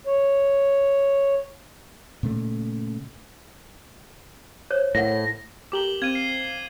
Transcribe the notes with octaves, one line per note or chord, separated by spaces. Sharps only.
C#5
A#2 C#3 A3
C5 C#5
A2 A#4 F#5 A#6
A3 G4 A#4 D6 F#7 G7
C4 F5 G#6 D#7
C7